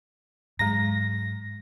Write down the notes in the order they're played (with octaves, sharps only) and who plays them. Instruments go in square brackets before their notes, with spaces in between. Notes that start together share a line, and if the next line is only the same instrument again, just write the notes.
[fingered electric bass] G#2 F#3 [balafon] G#3 A#5 [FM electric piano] A#6